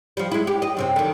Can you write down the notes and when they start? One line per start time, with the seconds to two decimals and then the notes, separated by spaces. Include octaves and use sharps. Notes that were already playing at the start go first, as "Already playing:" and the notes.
0.17 F3 G3
0.31 G#3 E4
0.47 G4
0.62 D#5
0.77 F#2 C3 C4
0.96 D3 D#3